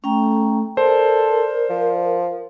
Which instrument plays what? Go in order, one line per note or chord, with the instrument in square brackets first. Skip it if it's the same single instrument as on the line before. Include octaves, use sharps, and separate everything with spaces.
[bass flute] A3 [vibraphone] C#4 G5 A#5
[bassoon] A4 [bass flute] A#4 [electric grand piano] C5 [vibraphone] D5
[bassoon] F3